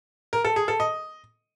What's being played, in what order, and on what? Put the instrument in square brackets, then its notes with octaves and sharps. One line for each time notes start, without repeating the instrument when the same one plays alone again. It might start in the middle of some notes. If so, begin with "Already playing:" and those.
[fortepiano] A#4
A4
G#4
A4
D#5